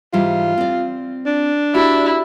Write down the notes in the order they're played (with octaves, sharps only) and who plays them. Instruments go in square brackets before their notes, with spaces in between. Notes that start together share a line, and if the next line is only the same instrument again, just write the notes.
[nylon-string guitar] G#2 E3 G3 [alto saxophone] F4
[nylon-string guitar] C4 D5
[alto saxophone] D4
[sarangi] E4 [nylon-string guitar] F#4 G4 E5